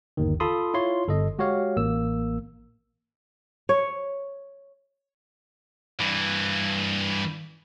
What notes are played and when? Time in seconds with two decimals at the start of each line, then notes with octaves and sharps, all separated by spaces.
0.17 G1 D#2 D#3
0.40 F4 A4 A5 B5 C6 D#6
0.74 E4 F4 C#5 C6
1.07 G1 A4 D#5
1.39 G#3 F#4 G4 C#5 F5
1.77 A1 A#3 E6
3.69 C#5
6.00 G2 E3